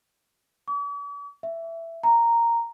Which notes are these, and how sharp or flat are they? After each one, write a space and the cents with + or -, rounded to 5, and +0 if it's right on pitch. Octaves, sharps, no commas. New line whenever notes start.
D6 -45
E5 +10
A#5 -5